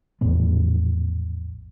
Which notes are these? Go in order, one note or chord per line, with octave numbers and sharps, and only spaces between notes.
A#1 E2 A2 B3